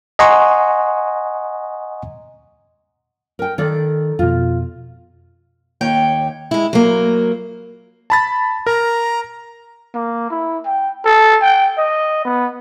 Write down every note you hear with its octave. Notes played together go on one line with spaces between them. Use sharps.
D#5 F#5 G#5 A#5 C6 C#6
A#4 G5
D#3 A4 D5
F2 B2 F4
D#2 C#5 G5
G#3 E4
F#3 A#3
A5 B5 A6
A#4 A#5
A#3
E4
G5
A4
G5
D#5
B3